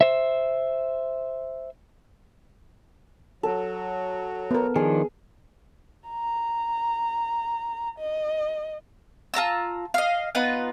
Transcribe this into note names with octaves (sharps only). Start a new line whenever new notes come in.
C5 E5
F#3 A4
B3 A#4
D#3 F3 D4 G#4
A#5
D#5
F4 A5 A#5 E6
D#5 F5
B3 D#4 F4 B4